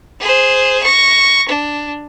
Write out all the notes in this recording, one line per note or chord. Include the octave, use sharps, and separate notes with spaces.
G#4 C5
C#6 A#6
D4